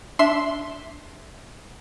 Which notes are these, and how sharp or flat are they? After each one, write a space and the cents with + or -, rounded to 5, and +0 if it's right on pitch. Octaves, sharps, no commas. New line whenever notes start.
D4 -15 E5 +0 C6 +0